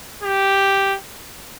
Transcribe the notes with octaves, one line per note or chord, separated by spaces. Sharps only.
G4